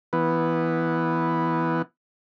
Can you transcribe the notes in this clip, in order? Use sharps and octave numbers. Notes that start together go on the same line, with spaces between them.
E3 B3